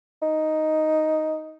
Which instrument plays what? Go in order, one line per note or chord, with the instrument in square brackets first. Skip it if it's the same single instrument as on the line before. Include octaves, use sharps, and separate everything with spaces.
[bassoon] D#4